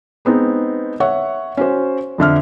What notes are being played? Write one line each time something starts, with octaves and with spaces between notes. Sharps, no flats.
G#3 B3 C4 D#4
C#5 E5 F#5 C#6
C#4 F#4 C5
F2 D3 E5 F6